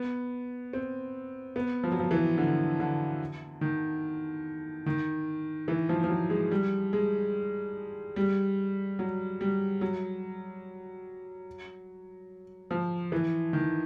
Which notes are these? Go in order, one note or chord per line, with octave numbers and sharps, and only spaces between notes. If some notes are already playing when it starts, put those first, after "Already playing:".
Already playing: B3
C4
B3
F3
F#3
F3
E3
D3
D3
D#3
D#3
E3
F3
F3
F#3
G#3
G3
G#3
G3
F#3
G3
F#3
F3
E3
D#3